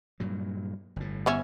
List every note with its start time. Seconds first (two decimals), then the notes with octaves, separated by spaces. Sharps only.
0.20 G2 A#2 F#3
0.96 G1 A2
1.26 B3 C#4 E5